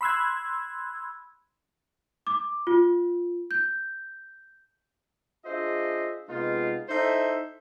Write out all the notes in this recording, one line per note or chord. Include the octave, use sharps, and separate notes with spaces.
B5 C6 E6 F#6 G#6
D6
F4
G6
D4 F4 G#4 C5 D#5 E5
C3 G#3 B3 D#4 F4
D#4 E4 A4 C5 E5